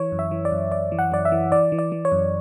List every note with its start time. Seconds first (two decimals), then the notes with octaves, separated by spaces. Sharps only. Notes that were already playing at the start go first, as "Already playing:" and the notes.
Already playing: E3 C#5
0.12 F#2
0.19 E5
0.31 E3
0.45 D5
0.52 F#2
0.72 F#2 D5
0.92 E3
0.99 F#5
1.12 F#2 D5
1.25 E5
1.32 E3
1.52 E3 D5
1.72 E3
1.79 D5
1.92 E3
2.05 C#5
2.12 F#2